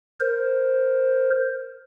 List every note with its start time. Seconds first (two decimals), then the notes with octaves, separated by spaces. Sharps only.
0.20 A#4 C5